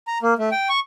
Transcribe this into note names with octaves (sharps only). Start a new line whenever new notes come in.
A#5
A#3
A3
G5
C#6